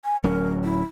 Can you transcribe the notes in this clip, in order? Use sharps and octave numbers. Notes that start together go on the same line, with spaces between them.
G#5
D1 F#3 C#4 A#4
E4